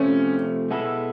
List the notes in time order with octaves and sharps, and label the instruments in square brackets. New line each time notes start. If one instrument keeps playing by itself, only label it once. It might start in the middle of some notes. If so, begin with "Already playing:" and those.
Already playing: [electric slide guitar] C3 F3 A3 [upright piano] C#4
[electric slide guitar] B2 G#3 B3 E4 A4